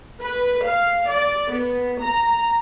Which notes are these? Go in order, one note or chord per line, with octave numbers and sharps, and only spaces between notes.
B4
F5
D5
B3
A#5